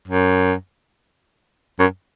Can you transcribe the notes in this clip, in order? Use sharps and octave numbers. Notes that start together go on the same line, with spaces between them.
F#2
F#2